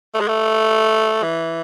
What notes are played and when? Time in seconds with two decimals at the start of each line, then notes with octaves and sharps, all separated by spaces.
0.14 A3
0.21 G#3
0.28 A3
1.23 E3